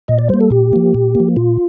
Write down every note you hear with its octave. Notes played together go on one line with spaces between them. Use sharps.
A#2 D#5
D5
G3 A#3 C5
A4
A#2 G4
F3 A#3
A#2
A#3
F3
A#2 F4